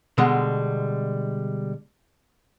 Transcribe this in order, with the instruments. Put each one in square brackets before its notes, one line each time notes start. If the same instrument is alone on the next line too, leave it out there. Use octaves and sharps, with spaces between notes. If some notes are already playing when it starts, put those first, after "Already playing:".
[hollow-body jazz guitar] B2 D3 G3 G#3